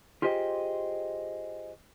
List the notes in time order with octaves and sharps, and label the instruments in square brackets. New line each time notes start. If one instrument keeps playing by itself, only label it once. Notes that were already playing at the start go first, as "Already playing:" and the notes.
[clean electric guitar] F4 G4 G#4 C5 D#5 G5